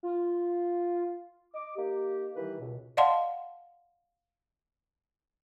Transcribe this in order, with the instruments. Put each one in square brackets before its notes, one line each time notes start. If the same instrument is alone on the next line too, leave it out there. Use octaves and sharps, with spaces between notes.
[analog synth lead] F4
[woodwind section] D#5 D6
A#3 D#4 G4
D#3 E3 G3 G4 B4
C#2 B2
[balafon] D5 D#5 F5 F#5 A5 C6